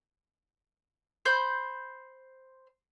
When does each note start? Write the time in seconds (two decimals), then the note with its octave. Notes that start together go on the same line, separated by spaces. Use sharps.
1.25 C5 B5 G6